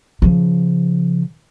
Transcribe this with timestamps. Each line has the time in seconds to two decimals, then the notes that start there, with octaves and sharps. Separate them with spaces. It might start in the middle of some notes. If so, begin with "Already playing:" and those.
0.22 C#3 F3